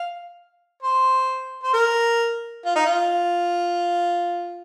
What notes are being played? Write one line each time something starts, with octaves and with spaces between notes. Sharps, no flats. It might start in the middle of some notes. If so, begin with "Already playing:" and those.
Already playing: F5
C5
C5
A#4
F4
D#4
F4